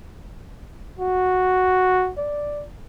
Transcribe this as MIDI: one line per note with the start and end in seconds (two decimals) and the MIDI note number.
0.99 2.12 66
2.18 2.64 74